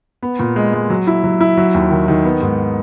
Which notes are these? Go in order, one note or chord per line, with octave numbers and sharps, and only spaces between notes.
B3
A#2
G#3
G#3
F#3
E4
F#3
E4
F#3
D#2
D#3
D#3
B3
G#2